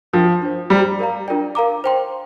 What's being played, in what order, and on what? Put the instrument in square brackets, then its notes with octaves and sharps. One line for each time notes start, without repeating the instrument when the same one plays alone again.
[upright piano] F3 [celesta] D4 F4 A#4 G5
[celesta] D4 F4 C5
[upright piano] G3 [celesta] G4 C5 A#5 D6
[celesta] A#4 D5 F5 A#5
D4 F4 A#4 D5 G5
A#4 F5 A#5 D6
C5 G5 C6